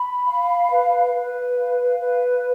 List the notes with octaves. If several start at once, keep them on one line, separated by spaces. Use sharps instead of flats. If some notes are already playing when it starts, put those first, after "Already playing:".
Already playing: B5
F5
B4
B4
F5
B4